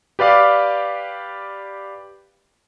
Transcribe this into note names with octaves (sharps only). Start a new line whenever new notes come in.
G4 B4 D5 F5 D6